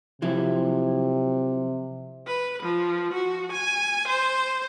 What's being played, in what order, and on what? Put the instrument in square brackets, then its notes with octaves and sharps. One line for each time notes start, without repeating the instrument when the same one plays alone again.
[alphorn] C3 [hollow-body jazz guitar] F3 F#3 E4
[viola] B4
F3
F#4
G#5
C5